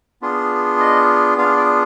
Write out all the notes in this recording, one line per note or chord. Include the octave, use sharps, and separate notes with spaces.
B3 D4 F4 G#4
D#5
B3 D4 F4 G#4 F5
D5